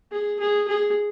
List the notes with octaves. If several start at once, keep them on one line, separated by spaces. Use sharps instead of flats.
G#4
G#4
G#4